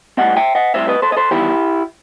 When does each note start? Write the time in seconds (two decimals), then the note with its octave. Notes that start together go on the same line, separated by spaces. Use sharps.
0.17 A2 G3 C4 D#5 F#5
0.36 E5 G5
0.55 D#5 F#5
0.74 A2 G3 C4 C5 E5
0.88 B4 D#5
1.02 A4 C5
1.12 D#5
1.17 A4 C5
1.31 E2 D#3 G3 E4 G4